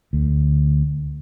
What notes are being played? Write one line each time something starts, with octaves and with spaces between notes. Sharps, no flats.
D2